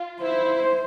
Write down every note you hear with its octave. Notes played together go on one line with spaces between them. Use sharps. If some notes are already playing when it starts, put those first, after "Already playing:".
Already playing: F4
E4 C5